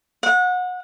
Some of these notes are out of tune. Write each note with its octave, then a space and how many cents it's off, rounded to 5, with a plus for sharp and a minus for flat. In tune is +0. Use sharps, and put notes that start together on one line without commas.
F#5 -30